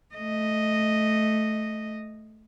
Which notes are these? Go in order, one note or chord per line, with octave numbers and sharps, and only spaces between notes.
A3 D#5